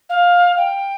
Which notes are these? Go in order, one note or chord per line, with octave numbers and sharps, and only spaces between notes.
F5
G5